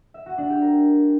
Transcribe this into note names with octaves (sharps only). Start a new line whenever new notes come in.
E5
F#4
D4
G4
A#4